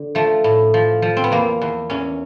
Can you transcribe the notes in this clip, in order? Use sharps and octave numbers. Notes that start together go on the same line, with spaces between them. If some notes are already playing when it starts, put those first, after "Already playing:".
Already playing: D3
F3 A3
A2
F3
F3
C4
B3
E2 A#3
E2
E2 C#4